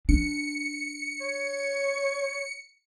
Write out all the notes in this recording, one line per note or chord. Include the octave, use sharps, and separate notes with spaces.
D4 C#7
C#5